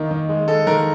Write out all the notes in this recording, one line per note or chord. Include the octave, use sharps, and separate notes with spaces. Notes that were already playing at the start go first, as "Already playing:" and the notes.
Already playing: D#3 A#3
D#3
G#3
G#3 A4
D#3 A#4